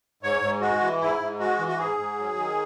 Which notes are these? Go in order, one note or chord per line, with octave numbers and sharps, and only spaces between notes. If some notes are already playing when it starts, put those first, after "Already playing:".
G#2 C#5
G#2
G#3 F#4
E3
G#2 E4
G#2
G#3 F#4
E3
F#4
G#2 G#4
G#2
F#3
D#3